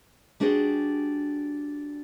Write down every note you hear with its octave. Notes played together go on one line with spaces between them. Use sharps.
G3 D4 F#4 G#4 C5